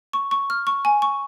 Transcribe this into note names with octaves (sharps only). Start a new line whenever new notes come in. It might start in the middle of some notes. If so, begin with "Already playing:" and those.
C#6
C#6
F6
C#6
G#5
C#6